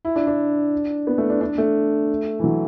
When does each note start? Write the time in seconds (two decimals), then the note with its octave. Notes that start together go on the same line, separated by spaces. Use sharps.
0.05 E4
0.16 D4
0.27 D4
1.07 B3
1.18 A3
1.30 D4
1.41 D4
1.58 A3
2.39 E3
2.44 F#3